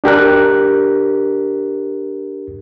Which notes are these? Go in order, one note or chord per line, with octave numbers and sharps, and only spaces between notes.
D4 G4 A#4 F#6